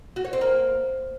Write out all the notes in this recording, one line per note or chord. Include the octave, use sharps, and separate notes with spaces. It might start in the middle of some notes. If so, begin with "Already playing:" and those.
F#4
C#5
C4
A#3